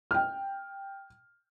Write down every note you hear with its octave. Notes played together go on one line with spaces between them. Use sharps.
G5 F6